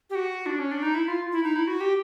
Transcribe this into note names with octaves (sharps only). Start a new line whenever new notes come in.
G4
F#4
D4
C#4
D4
D#4
E4
F4
E4
D#4
E4
F#4
G4